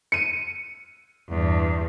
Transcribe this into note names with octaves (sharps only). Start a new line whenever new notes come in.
C#7 D#7
E2 G2